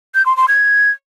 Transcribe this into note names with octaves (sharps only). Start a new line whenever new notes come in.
G6
C6
C6
G#6